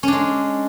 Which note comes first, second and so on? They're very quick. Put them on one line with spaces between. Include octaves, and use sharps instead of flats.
C#4 D4 G#3